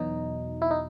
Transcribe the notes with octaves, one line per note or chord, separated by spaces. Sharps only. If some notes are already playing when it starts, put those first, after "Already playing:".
Already playing: E2 B2 F#3 D#4
E4
D#4